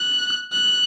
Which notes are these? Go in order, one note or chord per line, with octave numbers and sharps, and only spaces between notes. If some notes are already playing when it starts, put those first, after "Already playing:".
Already playing: F#6
F#6